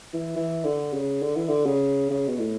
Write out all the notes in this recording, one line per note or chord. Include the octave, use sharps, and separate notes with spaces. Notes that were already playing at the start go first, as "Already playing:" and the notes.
E3
E3
D3
C#3
D3
E3
D3
C#3
C#3
B2
A2